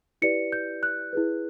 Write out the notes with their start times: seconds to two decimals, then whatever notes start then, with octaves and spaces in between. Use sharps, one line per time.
0.22 E4 G4 B4 D5 C#7
0.52 G6
0.83 F#6
1.13 E4 G#4 B4